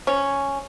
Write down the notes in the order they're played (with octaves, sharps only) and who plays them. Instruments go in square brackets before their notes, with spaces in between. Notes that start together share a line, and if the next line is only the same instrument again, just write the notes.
[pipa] C#4